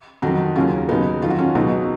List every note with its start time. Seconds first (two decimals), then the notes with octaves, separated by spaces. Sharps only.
0.22 F2 D#3 F#3 D#4 F#4
0.55 D#2 C#3 F#3 C#4 F4
0.89 D#2 C#3 F#3 B3 D#4
1.21 F2 D#3 F#3 F4
1.30 F#4
1.38 C#4 F4
1.55 C#2 B2 F#3 D#4 F#4